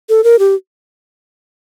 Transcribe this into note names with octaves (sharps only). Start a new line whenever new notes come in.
A4
A#4
G4